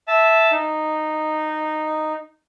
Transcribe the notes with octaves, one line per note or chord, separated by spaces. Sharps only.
E5 A5
D#4